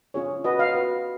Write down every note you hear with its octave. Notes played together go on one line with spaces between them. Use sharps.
C#4 F4 G#4 C#5
F#4 B4 D#5
F5
F#4 B4